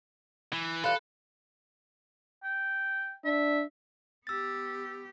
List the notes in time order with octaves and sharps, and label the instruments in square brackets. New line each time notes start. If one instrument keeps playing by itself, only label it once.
[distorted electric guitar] E3
[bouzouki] E3 G3 F4 [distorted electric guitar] A4 [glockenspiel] B5 F#6
[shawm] G5
[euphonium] D4 [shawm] E5
[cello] B3 G4 [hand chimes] E6 A6